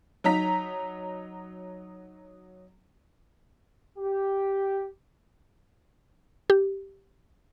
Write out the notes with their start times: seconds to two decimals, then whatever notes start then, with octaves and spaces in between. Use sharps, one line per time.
0.24 F#3 D#4 A#5 B6
3.99 G4
6.50 G4